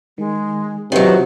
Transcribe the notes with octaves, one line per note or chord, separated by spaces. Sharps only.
D#3 G#3
C3 D#3 F#3 C#4 F4 F#4 B4